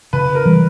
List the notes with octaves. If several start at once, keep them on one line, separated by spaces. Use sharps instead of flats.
C#3 B4
A#4
E3 G3